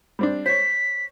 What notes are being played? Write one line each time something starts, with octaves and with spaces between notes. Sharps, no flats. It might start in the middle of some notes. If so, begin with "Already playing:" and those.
G3 C4 D4
C5 C#5 B6